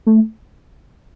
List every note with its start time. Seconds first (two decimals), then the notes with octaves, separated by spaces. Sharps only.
0.06 A3